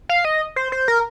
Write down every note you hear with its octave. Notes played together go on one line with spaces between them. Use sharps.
F5
D#5
C5
C5
A#4